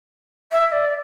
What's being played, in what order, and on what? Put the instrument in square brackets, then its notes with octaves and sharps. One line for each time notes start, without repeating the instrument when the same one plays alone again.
[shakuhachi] E5
D5